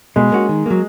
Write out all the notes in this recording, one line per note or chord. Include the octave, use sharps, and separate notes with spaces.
B2 G#3
A#3 C#4 F#4
D#3
F#3 A#3